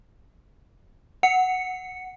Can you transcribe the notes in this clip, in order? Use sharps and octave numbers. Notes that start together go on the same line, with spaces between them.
F#5 C#7